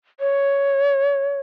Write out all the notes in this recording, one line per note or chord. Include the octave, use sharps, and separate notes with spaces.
C#5